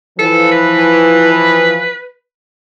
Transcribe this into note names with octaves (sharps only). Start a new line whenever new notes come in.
E3 F3 A4
B4